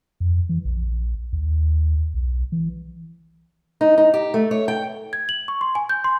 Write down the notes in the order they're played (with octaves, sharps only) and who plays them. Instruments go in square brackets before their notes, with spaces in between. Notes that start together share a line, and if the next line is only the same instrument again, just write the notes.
[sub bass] F2
E3
A#1
D#2
B1
E3
[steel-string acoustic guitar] D#4
D#4
G4
A3
C#5
G5
[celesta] G#6
F#7
C#6
C6
G#5
G6
C6